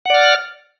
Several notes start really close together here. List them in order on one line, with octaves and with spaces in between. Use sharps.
F#5 D5 F6